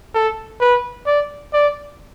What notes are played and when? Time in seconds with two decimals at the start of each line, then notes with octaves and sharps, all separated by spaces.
0.14 A4
0.61 B4
1.07 D5
1.53 D5